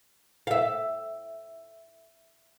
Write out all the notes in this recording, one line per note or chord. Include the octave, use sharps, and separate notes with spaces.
E5 F5